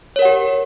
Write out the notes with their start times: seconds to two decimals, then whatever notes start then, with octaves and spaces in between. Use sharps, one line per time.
0.16 C#5
0.19 A#4
0.22 F#5
0.25 G4